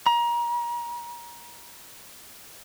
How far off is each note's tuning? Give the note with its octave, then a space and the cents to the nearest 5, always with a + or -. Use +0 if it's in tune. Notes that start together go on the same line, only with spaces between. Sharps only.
A#5 +30